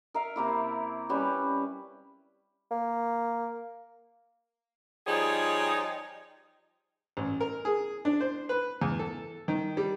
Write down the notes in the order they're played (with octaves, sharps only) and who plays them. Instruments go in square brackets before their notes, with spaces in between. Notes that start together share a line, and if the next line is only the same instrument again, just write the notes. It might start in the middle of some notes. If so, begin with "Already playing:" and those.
[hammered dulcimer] A#4 E5 F5
C3 A#3 E4
G3 C#4 B4
[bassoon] A#3
[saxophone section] F3 G3 D#4 G#4 C#5
[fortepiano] A1
A#4
G#4
D4
C5
B4
E2
A4
D#3
G3